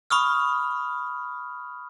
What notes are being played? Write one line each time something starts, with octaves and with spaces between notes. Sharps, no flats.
B5 C#6 D#6 F6